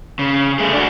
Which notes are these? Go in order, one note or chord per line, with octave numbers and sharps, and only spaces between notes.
C#3
A3 G#4
D4 F#4